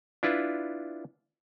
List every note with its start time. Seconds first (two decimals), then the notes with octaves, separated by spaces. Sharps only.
0.23 D4 E4 F4 B4